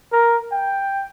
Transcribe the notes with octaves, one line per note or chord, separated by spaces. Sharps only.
A#4
G5